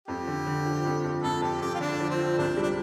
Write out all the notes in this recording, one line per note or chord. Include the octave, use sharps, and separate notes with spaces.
F2 G4
D3
D3
F3
F2
F2
F2 A4
F2 G4
F2 G4
F4
D3 D4
F3
C4
F3
C2 D4
G3
D4